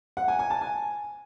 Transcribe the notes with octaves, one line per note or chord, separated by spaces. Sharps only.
F#5
G#5
G#5
A5
G#5